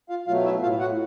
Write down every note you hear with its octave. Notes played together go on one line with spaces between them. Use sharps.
F4 F5
B2 F#3 A3 F4 F5
E4 E5
A2 F4 F5
F#4 F#5